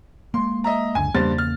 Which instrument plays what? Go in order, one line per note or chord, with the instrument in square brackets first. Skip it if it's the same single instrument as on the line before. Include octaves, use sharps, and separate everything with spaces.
[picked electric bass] G#3 A#3 [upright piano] C6
[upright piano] D#5 E5 A#5
[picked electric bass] F#1 C#2 D3 [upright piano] G#5
[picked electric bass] E2 C#3 A#3 [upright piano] G2 C5 A6
[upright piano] F6